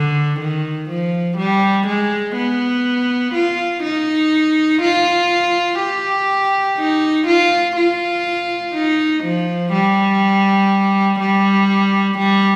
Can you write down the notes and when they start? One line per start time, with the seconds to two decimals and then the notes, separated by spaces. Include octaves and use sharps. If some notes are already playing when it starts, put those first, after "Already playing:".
Already playing: D3
0.40 D#3
0.89 F3
1.38 G3
1.87 G#3
2.36 B3
3.34 F4
3.83 D#4
4.82 F4
5.80 G4
6.78 D#4
7.27 F4
7.76 F4
8.74 D#4
9.24 F3
9.72 G3
11.19 G3
12.18 G3